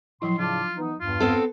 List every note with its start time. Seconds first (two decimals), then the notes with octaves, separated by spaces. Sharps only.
0.22 A2 F3 F#3 E4 C6
0.39 A2 C#3 D4 F4
0.77 E3 B3 D#4
1.01 E2 G2 F4
1.20 B3 C4 A4 B4